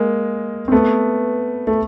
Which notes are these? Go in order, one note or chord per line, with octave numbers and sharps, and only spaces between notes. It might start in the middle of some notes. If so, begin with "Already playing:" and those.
Already playing: G#3 A#3
C4
A3 B3
A3